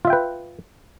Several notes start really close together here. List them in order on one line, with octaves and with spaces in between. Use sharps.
F4 E5 G5 B4